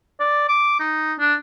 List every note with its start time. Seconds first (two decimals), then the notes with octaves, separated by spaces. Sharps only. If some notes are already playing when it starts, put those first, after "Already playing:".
0.20 D5
0.48 D6
0.80 D#4
1.19 D4